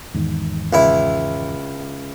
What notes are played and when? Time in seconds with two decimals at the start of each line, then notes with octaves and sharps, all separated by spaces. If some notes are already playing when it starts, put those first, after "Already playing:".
0.14 E2 G#2 D#3
0.73 C#2 E4